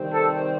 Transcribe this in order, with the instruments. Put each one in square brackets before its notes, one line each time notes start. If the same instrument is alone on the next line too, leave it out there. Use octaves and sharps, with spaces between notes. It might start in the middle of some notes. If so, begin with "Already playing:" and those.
Already playing: [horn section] C3 D#3 G3 C4
A4